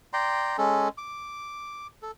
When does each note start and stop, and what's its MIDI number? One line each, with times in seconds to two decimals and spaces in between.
0.13 0.57 74
0.13 0.57 79
0.13 0.57 82
0.13 0.57 84
0.58 0.88 56
0.58 0.88 61
0.58 0.88 69
0.98 1.87 86
2.02 2.11 69